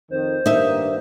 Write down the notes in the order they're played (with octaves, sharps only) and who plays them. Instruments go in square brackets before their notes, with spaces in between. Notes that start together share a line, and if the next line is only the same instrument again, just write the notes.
[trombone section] F2 D#3 [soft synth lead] C5
[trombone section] G2 D#3 A#3 [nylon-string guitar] D#4 E5